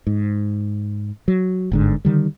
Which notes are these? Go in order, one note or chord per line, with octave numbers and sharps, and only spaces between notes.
G#2
F#3
G1 G#2 D3
D3 D#3 G3